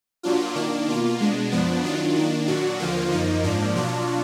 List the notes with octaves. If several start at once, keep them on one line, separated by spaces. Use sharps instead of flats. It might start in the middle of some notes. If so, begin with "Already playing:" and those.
A#2 F#3 D4 F4
D#3 A#3 D4
B2 A#3 F4
B2 G#3 D4
F#2 F3 B3 D4
D#3 F#3 D4 F4
D#3 A#3 D4
A#2 F#3 D4 F#4
D#2 D3 F3 A#3 F4
F#2 F3 A#3 D#4
G#2 F3 A#3 D4
B2 F#3 D4 F4